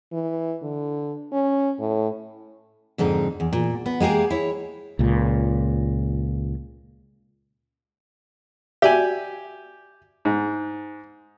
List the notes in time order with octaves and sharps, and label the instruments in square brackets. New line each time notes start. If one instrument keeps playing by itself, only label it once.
[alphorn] E3
D3
C#4
A2
[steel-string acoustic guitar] F2 G#2 D3 D#4
E2
A#2
B3
G#3 A#3 G4 G#4
E4 C#5
[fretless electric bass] C#2 A#2
[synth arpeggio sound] F#4 D5 E5 [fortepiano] G4 G#5
[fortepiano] G#2